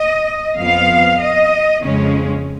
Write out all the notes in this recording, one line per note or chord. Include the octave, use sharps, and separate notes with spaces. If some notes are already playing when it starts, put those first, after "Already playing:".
Already playing: D#5
F2 F3 B3 F5
D#5
F2 C#3 G#3 C#4